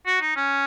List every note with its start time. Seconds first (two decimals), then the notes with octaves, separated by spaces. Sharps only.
0.07 F#4
0.21 D#4
0.36 C#4